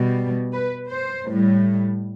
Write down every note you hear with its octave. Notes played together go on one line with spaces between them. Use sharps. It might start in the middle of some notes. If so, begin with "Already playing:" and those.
Already playing: B2 G3
B4
C5
A2 G3